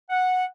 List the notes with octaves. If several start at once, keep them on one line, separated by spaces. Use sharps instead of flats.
F#5